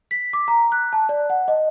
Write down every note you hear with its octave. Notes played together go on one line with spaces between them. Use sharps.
B6
D6
A#5
F#6
A5
D5
F#5
D#5